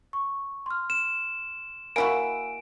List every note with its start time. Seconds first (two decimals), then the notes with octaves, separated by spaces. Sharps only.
0.13 C#6
0.66 C6 F6
0.90 E7
1.96 A#3 E4 F#4 G#5 D7